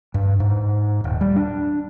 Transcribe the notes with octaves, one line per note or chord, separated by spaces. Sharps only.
G2
G#2
D#1
G3
D4